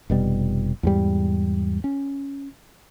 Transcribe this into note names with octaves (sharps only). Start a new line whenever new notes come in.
F1 B2 G3
E2 G#2 G3
C#4